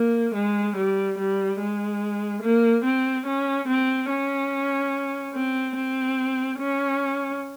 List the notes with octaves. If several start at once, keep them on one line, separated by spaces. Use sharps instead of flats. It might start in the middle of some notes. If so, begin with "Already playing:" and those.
Already playing: A#3
G#3
G3
G3
G#3
A#3
C4
C#4
C4
C#4
C4
C4
C#4